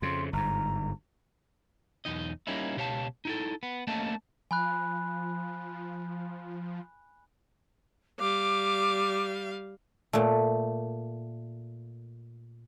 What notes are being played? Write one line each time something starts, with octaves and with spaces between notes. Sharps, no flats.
F2 C#3 C6
G1 G#2 A#5
B1 E2 D#4 D#5
G3 A#3 C#4 D#4 E4
C#2 B2 G4 C#5 F5 A5
D#4 E4 A4
B3
A3 A#3 C#4 D#5 F5 A5
F3 G#5 B5 F#6
G3 F5 D6
A#2 A3